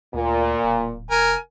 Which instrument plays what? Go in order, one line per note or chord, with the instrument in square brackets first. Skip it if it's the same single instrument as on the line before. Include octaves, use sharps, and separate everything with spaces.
[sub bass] D2 [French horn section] A#2
[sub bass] D1
[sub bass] F1 [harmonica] A#4 G#5